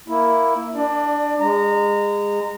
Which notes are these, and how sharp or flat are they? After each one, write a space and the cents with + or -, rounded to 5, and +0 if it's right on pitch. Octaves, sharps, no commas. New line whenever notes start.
A#3 +0 E4 +0
D4 +0 D5 +25
G#3 -25 A#5 -20